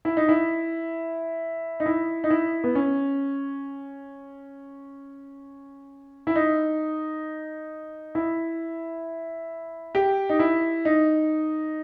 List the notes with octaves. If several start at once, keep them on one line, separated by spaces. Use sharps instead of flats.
E4
D#4
E4
D#4
E4
D#4
E4
B3
C#4
E4
D#4
E4
G4
D#4
E4
D#4